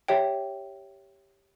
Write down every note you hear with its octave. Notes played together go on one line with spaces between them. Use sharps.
G4 C#5 E5 G5